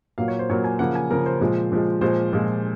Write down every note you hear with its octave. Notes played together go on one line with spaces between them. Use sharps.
A#2 F#3 A#3 F5
C#5
C5
A#2 F#3 A#3 C#5
G#5
C#3 F3 A#3 F#5
G#5
C#3 F3 A#3 A#4
C5
A#2 F3 G#3
A#2 F3 G#3
A#2 F3 G#3 C5
A#2 F3 G#3